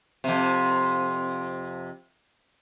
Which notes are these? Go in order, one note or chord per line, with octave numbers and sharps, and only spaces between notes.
F2 C3